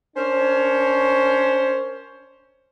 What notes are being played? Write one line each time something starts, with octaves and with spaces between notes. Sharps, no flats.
C#4 D4 A#4 C5 C#5